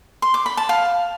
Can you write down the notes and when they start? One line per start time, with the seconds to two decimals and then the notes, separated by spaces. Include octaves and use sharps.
0.22 C6
0.34 D6
0.46 B5
0.57 A5
0.69 F5